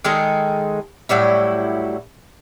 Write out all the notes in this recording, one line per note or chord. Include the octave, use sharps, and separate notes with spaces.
D#3 G#3 G#4 A4
A2 F#3 G3 E4